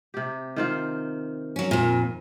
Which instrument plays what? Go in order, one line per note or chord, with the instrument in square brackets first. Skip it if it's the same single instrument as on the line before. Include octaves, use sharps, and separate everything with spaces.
[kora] C3 G4
D#3 C4 F4
[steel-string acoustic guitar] F#3 C#4
F2 A#2